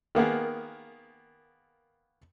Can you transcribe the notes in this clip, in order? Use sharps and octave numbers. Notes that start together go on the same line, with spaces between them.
D#3 A#3 B3 G#4